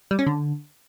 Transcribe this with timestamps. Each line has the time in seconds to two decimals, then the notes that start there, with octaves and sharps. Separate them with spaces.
0.11 G3
0.19 C#4
0.26 D3